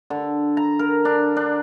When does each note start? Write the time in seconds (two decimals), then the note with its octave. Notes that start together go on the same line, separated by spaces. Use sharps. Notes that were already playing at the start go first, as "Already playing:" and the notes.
0.10 D3
0.57 A#5
0.79 A#4
1.05 D4
1.36 D4